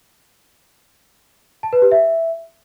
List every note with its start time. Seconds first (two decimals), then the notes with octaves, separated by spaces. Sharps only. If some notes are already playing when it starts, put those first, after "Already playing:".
1.63 A5
1.73 B4
1.82 G4
1.91 E5